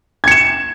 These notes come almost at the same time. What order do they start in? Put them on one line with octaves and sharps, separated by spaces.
G#6 C#7 E7